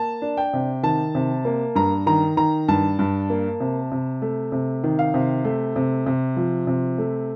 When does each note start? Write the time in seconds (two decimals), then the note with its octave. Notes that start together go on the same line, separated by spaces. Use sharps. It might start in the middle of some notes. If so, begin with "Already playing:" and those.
Already playing: A#3 A5
0.22 D4
0.37 G5
0.53 C3
0.83 D#3 A5
1.15 C3
1.45 A#3
1.75 G2 A#5
2.06 D#3 A#5
2.37 D#3 A#5
2.68 G2 A5
2.99 G2
3.30 A#3
3.60 C3
3.92 C3
4.22 A3
4.52 C3
4.84 D#3
4.99 F5
5.14 C3
5.45 A3
5.76 C3
6.06 C3
6.37 F3
6.67 C3
6.98 A3